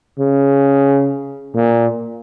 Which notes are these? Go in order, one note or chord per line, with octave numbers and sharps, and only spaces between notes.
C#3
A#2